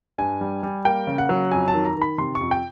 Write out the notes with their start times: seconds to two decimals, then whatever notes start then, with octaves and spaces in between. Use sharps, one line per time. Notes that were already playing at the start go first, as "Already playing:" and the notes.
0.18 G2 G#5
0.41 G3
0.63 G3
0.85 A#3 G5
1.07 C#3
1.18 F#5
1.29 F#3
1.51 F2 G#5
1.68 A5
1.73 D#3
1.85 A#5
1.96 D#3
2.02 B5
2.18 C3 C6
2.35 C#6
2.41 F2
2.51 G5